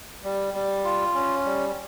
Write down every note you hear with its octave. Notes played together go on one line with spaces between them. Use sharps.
G3
G3
F4
C#4
G3